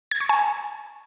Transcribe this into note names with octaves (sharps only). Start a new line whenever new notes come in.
G#6
C#6
G#5